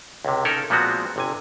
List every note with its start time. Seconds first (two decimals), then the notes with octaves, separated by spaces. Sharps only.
0.25 C#2 C3
0.45 C#4 D#4 A4 A#4
0.70 A#2 F3 G#3 B3 C4 F#4
1.16 G1 C3 G#5